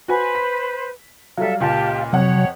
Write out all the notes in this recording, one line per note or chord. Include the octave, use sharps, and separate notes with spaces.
F#4 B4 C5 G#5
B6
F#3 G3 A4 E5 F5
C#2 A#2 G4 A5
F2 C3 F#3 C#5 F#5